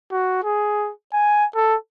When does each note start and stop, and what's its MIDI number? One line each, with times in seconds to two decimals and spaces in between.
0.12 0.39 66
0.44 0.91 68
1.13 1.45 80
1.55 1.76 69